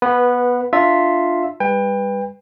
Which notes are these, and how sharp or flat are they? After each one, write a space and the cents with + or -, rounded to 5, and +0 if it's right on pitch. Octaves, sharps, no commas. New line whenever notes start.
B3 -15 B4 +0
D4 +20 F4 +0 E5 +0
G3 +30 B4 +0 G5 +30